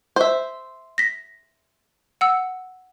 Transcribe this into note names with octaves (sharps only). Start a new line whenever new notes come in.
C5 E5
A#6 B6
F#5 E6